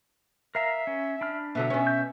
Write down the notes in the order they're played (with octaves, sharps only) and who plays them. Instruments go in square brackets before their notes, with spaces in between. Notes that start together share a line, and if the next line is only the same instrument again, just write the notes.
[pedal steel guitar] A#4 F5 A#5 [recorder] E5
[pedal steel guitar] C#4
D4 B5 F6
[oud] B2 D3 F#3 [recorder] E5
[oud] B2 C#4
[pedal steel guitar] G6